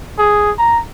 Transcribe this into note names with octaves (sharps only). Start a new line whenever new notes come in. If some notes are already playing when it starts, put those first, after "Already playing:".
G#4
A#5